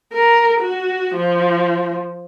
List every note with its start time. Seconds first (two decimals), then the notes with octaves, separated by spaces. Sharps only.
0.13 A#4
0.60 F#4
1.16 F3